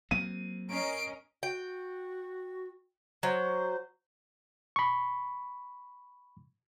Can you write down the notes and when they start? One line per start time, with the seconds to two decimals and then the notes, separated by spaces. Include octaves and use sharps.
0.11 F#3 A#3 C4 D#7
0.70 C#4 A#4 D#5 C7 D7
1.43 F#4 G5
3.23 F#3 C5
4.76 B5 C#6